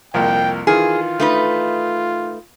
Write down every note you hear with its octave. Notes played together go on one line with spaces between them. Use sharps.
C2 F2 A#3 G5
D#3 E3 F4 G#4 F6
A3 D#4 B4